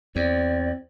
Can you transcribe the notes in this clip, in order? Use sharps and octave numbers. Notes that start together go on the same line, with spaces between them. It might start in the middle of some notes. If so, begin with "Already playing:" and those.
E2 C4 D5